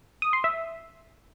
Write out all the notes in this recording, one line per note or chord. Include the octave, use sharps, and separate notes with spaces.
D#6
C6
E5